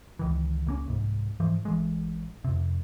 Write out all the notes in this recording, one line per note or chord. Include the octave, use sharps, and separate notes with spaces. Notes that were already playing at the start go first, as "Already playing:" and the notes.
C#2 D#3 E3
C#2 A#3 C#4
C2 G#2
G#2 E3 F3
A1 E3 G#3
F2 C3